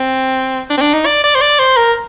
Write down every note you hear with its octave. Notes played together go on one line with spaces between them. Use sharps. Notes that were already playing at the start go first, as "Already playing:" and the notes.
Already playing: C4
D4
C4
D4
D#4
D5
D5
C5
D5
C5
A#4